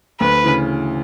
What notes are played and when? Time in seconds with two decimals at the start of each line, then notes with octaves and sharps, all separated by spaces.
0.20 D2 B4
0.44 C#3 E3